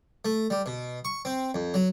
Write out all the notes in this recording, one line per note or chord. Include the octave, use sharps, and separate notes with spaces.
A3
G3
B2
C#6
C4
F2
F#3